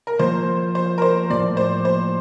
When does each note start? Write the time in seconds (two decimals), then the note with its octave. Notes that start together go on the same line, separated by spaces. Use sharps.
0.07 A#4
0.19 F3 A#3 F4 C5
0.75 C5
0.98 A#4
1.02 C5
1.30 A2 F3 A#3 D5
1.57 C5
1.85 C5